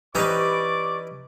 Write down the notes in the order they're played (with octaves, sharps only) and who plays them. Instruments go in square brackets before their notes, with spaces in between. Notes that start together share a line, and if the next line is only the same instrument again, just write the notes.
[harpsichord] E3 C#4 D#4 [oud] G4 B4 [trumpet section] D5 C#6 D6